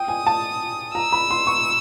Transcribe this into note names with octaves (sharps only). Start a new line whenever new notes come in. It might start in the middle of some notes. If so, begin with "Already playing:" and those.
Already playing: G5 D#6
G#5
A5
A#5 E6
B5
C6
C#6